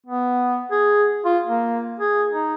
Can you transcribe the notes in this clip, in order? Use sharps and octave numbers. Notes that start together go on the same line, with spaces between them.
B3
G#4
F4
A#3
G#4
D#4